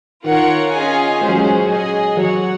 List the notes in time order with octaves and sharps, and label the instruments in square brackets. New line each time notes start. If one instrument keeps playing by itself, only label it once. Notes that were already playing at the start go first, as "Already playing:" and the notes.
[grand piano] D#3 [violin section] F4 A#4 C#5 F#5
[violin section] C#4 F4 G#4 D#5 G#5
[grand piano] G#3 [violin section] C#4 G#4 C5
[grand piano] F#3
G#3
[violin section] G#4 D#5 G#5
[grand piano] F#3 [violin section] F#4 C#5 F#5